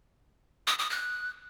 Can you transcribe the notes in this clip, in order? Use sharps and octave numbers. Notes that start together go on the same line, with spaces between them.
D#6
D#6
F#6